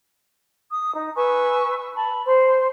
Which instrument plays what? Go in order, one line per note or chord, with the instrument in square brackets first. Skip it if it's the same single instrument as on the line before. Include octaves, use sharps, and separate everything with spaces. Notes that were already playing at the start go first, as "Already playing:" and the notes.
[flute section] D#6
D#4
B4 G#5 C#6 E6
A5 B5
C5 C6